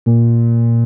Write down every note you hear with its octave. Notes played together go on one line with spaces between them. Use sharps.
A#2